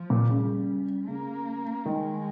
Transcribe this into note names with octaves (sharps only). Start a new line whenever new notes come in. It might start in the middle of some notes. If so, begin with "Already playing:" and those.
Already playing: F3
A#2
C#3 G3
C#3 A#3
D#3 G#3